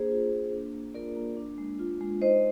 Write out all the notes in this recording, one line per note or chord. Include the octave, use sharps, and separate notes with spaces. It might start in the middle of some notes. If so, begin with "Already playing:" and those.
Already playing: A#3 D4 G#4 C5
F4
A#3
D4
A#3
F4 A#4 D5
A#3
D4
G#3
F4
G#3
D#4 C5 D#5